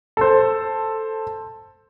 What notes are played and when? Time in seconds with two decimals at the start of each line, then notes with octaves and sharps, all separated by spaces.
0.17 A4 C5